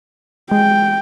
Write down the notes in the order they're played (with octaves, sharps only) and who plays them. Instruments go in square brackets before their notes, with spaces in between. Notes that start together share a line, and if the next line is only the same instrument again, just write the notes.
[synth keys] G#3 [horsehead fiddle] G5